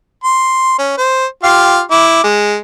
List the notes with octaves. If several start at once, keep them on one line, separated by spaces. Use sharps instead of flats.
C6
C#4
C5
F4 G4 F5
E4 D6
G#3